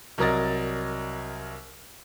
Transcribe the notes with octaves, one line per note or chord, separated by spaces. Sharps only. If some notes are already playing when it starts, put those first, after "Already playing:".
C2 F#3 A#4 D#5 A6